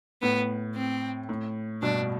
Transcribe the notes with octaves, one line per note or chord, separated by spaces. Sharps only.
A2 B3
C4
A2
G2 B2 D4